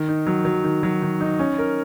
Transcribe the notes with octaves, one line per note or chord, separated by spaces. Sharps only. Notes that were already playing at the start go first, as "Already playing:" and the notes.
Already playing: D#3
D#4
F#3
F#3
D#3
F#3
D#3
D#4
C#4
A#4